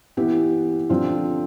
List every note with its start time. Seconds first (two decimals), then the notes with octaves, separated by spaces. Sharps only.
0.17 E3 B3 E4 G4
0.90 D3 F3 C4 F4